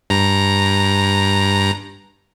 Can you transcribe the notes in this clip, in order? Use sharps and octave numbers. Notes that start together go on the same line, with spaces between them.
G2 A#5